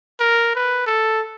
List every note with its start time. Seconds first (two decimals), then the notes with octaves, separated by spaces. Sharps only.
0.20 A#4
0.55 B4
0.86 A4